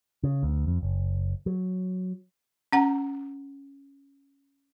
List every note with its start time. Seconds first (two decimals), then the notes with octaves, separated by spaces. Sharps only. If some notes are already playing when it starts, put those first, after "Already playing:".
0.24 C#3
0.43 D2
0.67 F2
0.83 F#1
1.46 F#3
2.72 C#4 F#5 A#5